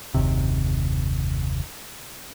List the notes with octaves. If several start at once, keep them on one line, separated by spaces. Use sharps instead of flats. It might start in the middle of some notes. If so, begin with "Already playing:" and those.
F#1 D#2 C3